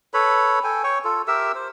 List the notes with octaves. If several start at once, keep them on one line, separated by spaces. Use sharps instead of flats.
A4 B4 C#5 B5
A4 G5 G#5
C#5 G5 C#6
F4 A4
G4 A#4 E5 E6
C5